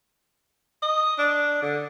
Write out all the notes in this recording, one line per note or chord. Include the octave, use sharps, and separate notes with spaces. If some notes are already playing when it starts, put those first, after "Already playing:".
D#5
D4
D3